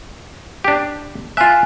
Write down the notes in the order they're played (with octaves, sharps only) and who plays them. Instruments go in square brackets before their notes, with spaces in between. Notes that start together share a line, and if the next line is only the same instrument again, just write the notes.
[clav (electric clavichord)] D4 G4
[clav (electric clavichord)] F4 E5 [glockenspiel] G#5 F#6